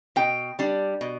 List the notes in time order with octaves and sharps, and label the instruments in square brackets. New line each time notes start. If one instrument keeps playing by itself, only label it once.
[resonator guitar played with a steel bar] B2 G5
G3 D4
B2